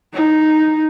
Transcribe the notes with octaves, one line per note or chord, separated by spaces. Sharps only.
D#4